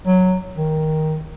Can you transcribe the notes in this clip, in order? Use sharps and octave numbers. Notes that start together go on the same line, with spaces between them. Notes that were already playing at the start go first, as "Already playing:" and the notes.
F#3
D#3